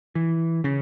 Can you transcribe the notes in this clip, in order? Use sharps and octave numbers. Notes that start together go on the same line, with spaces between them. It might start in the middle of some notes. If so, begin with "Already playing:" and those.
E3
C#3